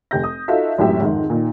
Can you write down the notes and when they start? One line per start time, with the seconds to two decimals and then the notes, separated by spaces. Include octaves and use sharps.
0.11 F1 G4 G6 A#6
0.23 D#6
0.48 D#4 F4 F#4 A4 E5
0.78 G#1 F#2 A2 F#4 G4 E5
1.01 F2 G#2 D#3
1.30 A#2 D#3